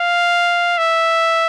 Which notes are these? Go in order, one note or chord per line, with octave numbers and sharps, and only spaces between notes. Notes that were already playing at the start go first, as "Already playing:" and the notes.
Already playing: F5
E5